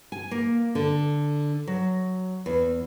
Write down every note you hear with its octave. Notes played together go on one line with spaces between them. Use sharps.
G#5
A#3
D3
F#3
E2